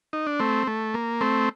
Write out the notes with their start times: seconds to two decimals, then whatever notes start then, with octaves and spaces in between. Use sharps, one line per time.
0.13 D#4
0.27 D4
0.39 A3 C4
0.67 A3
0.94 A#3
1.21 A3 C4